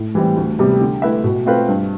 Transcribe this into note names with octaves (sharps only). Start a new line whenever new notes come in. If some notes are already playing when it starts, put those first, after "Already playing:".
Already playing: A2
E3 G3 C4
D2
C3 G3 B3
D3
A3 E4 B4 E5
B2
A3 C4 F4 B4
G2